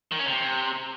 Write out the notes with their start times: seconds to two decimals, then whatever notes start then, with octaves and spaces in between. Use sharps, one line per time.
0.12 D#3
0.19 C#4
0.26 C3